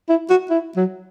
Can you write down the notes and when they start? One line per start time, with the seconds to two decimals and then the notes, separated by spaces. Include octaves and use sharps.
0.09 E4
0.30 F#4
0.50 E4
0.76 F#3